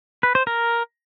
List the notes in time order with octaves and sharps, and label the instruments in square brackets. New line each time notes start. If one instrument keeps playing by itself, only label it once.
[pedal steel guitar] B4
C5
A#4